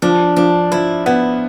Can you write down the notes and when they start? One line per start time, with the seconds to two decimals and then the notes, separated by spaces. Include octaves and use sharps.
0.02 F3 D4
0.36 F3 D4
0.72 F3 E4
1.06 B3 E4